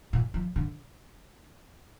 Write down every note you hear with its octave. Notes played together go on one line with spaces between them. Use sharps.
A#2
F3
D3